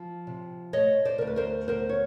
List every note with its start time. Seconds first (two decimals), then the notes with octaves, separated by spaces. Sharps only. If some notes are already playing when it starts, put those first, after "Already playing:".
Already playing: F3
0.27 C3
0.73 A3 C#5 D#5
1.05 C5 D5
1.18 D2 A#4
1.27 B4
1.36 A#4 C5
1.68 B3 A#4 C5
1.89 C#5